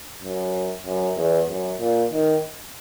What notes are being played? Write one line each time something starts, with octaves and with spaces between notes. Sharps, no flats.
F#2
F#2
E2
F#2
A#2
D#3